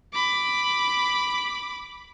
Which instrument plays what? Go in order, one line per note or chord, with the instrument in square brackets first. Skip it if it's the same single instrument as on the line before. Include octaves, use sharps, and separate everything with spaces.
[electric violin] B5 D6